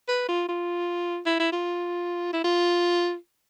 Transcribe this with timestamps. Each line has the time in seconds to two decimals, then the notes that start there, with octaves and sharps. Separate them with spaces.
0.09 B4
0.29 F4
0.48 F4
1.26 E4
1.39 E4
1.53 F4
2.33 E4
2.44 F4